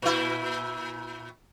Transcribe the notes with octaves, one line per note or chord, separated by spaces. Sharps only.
A#2 E4